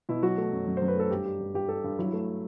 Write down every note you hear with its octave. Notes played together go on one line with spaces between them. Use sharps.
B2 E4
F#3 F#4
A3
F#2
F#2
F#2 C5
B4
A3 A4
G2 G4
G3
G2
G2 G4
G3 A4
G2
F#3 E4
A3